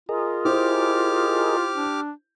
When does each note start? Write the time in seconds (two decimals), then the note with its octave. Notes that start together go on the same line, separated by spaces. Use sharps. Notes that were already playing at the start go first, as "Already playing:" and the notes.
0.09 F4 G#4 A#4 D#5
0.45 E4 G4 C5 D6 F6
1.75 D4